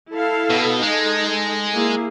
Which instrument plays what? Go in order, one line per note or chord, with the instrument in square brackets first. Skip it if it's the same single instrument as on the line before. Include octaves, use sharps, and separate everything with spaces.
[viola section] E4 A4 F5
[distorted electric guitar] B2
[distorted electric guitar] G#3 [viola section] D#4 A4
[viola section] A#3 E4 G#4